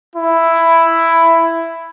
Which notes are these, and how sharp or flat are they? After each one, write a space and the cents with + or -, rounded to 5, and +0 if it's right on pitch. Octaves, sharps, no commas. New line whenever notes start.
E4 +5